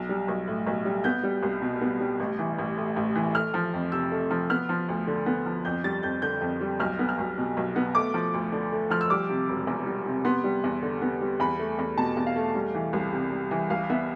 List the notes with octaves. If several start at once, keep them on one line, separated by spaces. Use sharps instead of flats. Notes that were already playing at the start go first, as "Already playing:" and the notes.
Already playing: B1
G3
B1
A2
B1
G3
B3 G6
G3
C2
B2
B3
G3
A1
E3
A1
A2
A1
E3
A3 F6
F3
F2
C3 E6
A3
F3
B3 F6
F3
D2
D3
B3
F3
F2 G6
G3 A6
F2 G6
D3 G6
F2
G3
B1 F6
B3
F6
B1
B2
B1
B3
A3 D6
F3
D2
D3
A3
F3 F6
E6
G3 D6
C3
E1
E2
G3
C3
B3 C6
G3
E2
D3
B3
G3
E2 B5
A3
E2
B2 A5
E2
F5
A3
G3
E3
C2
C3
G3
E3
C2 F5
B3 E5